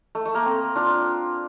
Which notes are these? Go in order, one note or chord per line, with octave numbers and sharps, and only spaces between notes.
A3
A3
A#3
C4
D4 F4